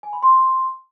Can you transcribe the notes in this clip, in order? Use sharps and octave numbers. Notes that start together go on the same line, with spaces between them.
G#5
B5
C6